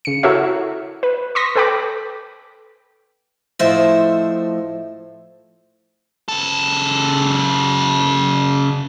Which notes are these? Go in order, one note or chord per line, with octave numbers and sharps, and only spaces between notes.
C#3 C#7
E4 F#4 A4 A#4 C#5 E5
B4
C6 C#6 D#6 A#6 B6
A4 B4 G5 B5 D6
A2 F3 C5 D#5 E5
C#3 A4